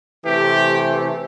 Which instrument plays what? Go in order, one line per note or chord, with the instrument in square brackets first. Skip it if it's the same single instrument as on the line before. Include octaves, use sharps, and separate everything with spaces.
[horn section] C3 E3 A3 G4